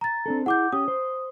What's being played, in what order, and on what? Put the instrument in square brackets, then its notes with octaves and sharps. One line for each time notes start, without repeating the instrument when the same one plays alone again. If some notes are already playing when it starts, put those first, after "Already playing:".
[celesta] A#5 A6
[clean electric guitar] C4 D4 A4
[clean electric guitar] E4 G#4 [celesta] F#5 D6 G6
[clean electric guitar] C#4 G4 [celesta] D#6
[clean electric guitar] C5